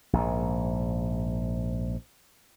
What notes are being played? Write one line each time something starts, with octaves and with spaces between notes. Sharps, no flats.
A#1 G#2